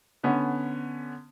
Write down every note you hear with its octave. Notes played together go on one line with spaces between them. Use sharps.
D3 B3 C#4